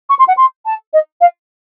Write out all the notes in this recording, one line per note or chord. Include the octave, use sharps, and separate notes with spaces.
C#6
C6
F#5
C6
A5
D#5
F5